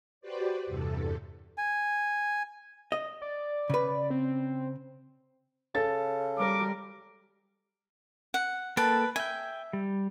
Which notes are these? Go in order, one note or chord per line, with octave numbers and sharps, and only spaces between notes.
F#4 G4 B4 C5 D5
E2 G2 C3 A4
G#5
D#5
D5
C#3 B4
C4
C#3 A4 A6
G3 A#4 D6
F#5
A#3 A4 B4 G5 A5
E5 G5 G#5
G3